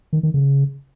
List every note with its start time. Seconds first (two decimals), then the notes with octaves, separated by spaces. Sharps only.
0.13 D#3
0.23 D#3
0.34 C#3